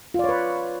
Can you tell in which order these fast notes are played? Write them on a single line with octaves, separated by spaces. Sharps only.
F4 D5 C#5 B4